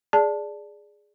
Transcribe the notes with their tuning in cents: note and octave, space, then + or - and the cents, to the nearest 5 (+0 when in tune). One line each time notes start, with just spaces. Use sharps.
G#4 +0 D5 +0 A5 +0